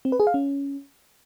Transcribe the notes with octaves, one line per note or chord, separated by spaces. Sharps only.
C4
B4
G#4
F5
C#4